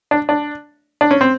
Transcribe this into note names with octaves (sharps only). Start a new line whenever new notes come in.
D4
D4
D4
C#4
C4